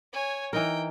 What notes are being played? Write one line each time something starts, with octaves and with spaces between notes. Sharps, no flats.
C#5 G#5
E3 D#4 A#4 G5